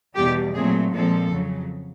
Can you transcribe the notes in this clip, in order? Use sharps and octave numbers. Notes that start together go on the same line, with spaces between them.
E2 B2 G3 G4
A#2 F#3 A3 C4 G#4
A#2 F3 G#3 C4 A4
F2 C#3 F#3